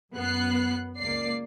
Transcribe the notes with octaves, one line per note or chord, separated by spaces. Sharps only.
F#2 B3 F#6 C7
C#2 A#3 D5 C7